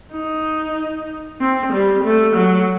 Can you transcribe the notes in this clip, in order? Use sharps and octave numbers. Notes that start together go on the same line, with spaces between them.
D#4
C4
G3
A3
F#3